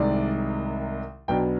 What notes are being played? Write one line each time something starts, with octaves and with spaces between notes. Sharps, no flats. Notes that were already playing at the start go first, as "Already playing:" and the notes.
Already playing: C2 C3 D#3 G#3 D5
B1 B2 B3 D4 G5